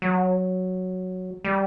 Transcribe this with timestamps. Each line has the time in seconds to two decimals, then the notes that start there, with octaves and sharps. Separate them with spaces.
0.02 F#3
1.44 G3